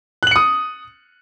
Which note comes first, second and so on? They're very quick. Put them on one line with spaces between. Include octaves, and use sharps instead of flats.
F#6 F#7 C#7 D#6